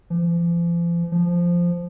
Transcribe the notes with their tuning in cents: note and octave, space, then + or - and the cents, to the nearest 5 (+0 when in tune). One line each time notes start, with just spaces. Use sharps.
F3 -40
F3 -5